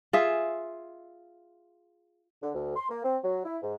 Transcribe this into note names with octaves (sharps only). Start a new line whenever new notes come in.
F4 G#4 E5
D3
D2
C6
A#3
C4
F#3
E4
G#2